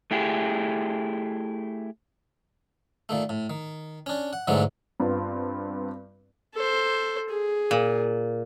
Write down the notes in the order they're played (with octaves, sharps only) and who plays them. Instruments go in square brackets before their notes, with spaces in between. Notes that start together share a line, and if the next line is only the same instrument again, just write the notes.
[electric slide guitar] A3 E4 G4 G#4
[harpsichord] A#2 D#3 A3
A2
D#3
C#4 D4
F#5
G#2 D3 E3 F#3 G#3 A3
[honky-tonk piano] G2 B3 C4 F4
[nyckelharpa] A4 C5
G#4
[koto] A#2